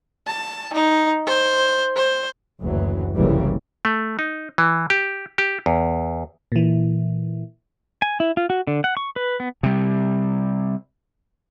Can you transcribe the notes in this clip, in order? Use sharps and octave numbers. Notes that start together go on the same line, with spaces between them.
A5
D#4
C5
C5
F#1 D2 E3 F#3
F#1 C2 C#3 E3 G3 A#3
A3
D#4
E3
G4
G4
E2
A#2 E3
G#5
E4
F4
F#4
D3
F#5
C#6
B4
B3
C3 G3